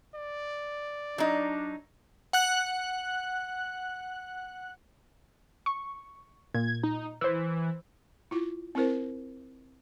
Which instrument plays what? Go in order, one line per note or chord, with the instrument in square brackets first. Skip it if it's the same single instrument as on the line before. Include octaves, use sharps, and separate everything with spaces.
[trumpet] D5
[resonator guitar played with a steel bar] F#3 D#4 [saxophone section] D4
[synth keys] F#5 F#6
[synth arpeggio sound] C#6
[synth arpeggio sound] A#2 [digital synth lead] G#6
[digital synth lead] D#4
[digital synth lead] E3 [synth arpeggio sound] C5 E6
[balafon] E4 F4
C4 E4 A#4 C5